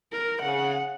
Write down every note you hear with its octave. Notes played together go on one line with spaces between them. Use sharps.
A#4
C#3 F#5